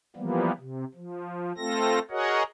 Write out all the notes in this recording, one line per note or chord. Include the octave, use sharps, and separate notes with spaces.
E3 F3 G3 A#3 B3
C3
F3
A3 C4 F4 A4 A#6
F#4 G#4 A#4 C#5 D#5 F#5